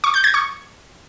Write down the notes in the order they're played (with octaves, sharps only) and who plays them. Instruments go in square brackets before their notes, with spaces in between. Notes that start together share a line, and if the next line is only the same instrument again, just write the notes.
[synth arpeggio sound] C#6
G6
G#6
C#6